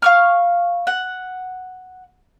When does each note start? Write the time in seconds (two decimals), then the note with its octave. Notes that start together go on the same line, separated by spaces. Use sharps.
0.02 F5 C#6 F6
0.87 F#5